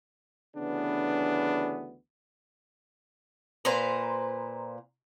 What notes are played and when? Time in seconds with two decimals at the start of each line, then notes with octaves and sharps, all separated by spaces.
0.57 D2 C#3 E3 B3 D4
3.65 A#2 B4 C5 A#5